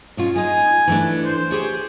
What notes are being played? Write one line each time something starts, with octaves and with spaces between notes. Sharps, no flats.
B2 C#4 F4
G#3 D#4 G#5
E3 A3 D4
C5
G4 G#4 C#5